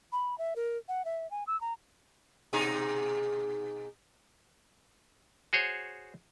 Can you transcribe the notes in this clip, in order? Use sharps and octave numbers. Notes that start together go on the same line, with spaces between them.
B5
E5
A#4
F#5
E5
G#5
E6
A#5
B2 D#4 G#4
F#4 G#4 C5 C#5